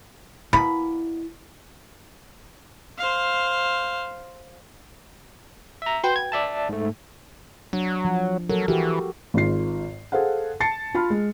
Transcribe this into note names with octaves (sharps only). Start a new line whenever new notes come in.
B2 A#3 E4 B5
C5 F5
E5 A#5
F#4 B4 G5 C6 G6
G#6
D5 E5 A5
G#2 A3
F#3 D4
F3
F#3 A4 A#4
E3 F#4 G4
G#1 G#2 F4 C7
G#4 A4 C5 F5 F#5
A5 A6 C7 C#7
F4 A5 B5 F6
G#3